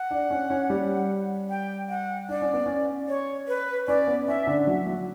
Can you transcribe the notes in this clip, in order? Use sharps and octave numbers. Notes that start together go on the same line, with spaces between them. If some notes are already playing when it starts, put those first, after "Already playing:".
Already playing: F#5
D4 D5
C#4 C#5
C#4 C#5
G3 G4
G5
F#5
D4 D5
C#4
B3
C#4
C#5
B4
C#4 D5
B3
C#4 E5
D3 D4
F#3 F#4
F#3 F#4